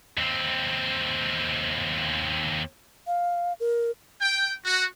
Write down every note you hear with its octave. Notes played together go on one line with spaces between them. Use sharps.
D#2 C4
F5
A#4
G5
F#4